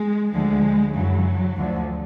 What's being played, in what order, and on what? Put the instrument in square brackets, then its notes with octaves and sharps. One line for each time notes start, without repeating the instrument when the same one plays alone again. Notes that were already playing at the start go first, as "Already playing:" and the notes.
Already playing: [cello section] G#3
D2 D3 F3 G#3
F#2 C#3 E3 F#3
D2 D3 F3